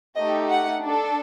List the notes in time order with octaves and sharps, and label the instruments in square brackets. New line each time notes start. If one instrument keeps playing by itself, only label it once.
[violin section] A3 D#4 G4 D#5
F#5
D4 A4